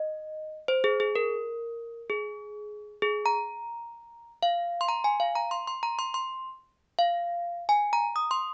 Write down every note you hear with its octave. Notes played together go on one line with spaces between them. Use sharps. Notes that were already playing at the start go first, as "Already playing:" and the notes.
Already playing: D#5
C5
G#4
G#4
A#4
G#4
G#4
A#5
F5
C6
A#5
G#5
F5
A#5
C6
C6
A#5
C6
C6
F5
G#5
A#5
D#6
C6